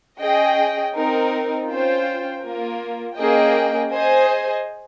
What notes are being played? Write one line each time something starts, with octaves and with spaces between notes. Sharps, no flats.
C#4 G#4 D#5 G5
C4 D#4 A#4
C#4 F4 C5 G5
A#3 F4 A#4
A#3 C#4 G#4 D#5 G5
G#4 C5 D#5 G#5